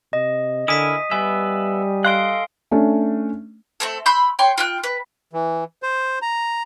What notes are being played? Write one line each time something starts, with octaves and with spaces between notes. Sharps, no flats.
C3 D#5
D3 E4 A#4 G#5 D#6 B6 D#7
G3 B3 B4 E5 G#5
A4 D#5 F5 C6 F#6 D7
A3 C#4 D4
A3 C4 A4
B5 C6 E6 G6
C#5 G5 C6
F4 G5 F#6
B4
E3
C5
A#5